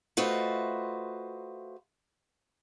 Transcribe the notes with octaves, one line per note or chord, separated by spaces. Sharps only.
A3 F4 F#4 B4 C5 D#5